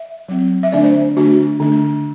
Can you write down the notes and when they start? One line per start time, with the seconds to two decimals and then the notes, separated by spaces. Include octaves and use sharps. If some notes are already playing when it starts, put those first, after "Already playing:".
Already playing: E5
0.29 F#3 C4
0.63 E5
0.72 D3 A3 D4 D5
0.84 C5
1.17 D3 A3 D4 F#4
1.60 D3 A3 D4